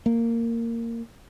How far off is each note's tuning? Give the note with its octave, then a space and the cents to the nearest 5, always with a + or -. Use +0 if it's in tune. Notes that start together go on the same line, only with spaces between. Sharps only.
A#3 -15